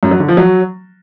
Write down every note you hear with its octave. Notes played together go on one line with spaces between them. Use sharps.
F#2
F#3
D3
F3
F#3